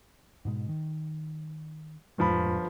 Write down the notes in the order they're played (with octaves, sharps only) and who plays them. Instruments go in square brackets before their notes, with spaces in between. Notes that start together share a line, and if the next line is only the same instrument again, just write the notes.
[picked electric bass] G#2 B2 G#3
D#3
[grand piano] G1 F3 B5 [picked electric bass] F2 A2 G#3